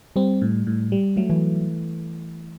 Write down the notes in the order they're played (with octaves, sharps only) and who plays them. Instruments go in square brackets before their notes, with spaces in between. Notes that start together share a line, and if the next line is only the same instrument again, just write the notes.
[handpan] G3 [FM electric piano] C4
[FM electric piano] A2
A2
G3
[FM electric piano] F#3 [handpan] A3
[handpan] E3